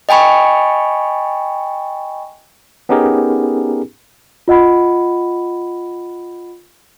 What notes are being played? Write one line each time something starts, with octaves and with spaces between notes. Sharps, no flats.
D#5 G5 G#5 B5 C#6
B3 C#4 D#4 G4 G#4 A#4
F4 D#5 F#5 B5